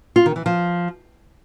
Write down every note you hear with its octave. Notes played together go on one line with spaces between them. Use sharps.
F4
D#3
E3
F3